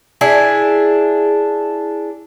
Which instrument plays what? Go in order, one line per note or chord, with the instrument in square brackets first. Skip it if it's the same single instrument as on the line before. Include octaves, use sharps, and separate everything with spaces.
[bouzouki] D4 E4 G#4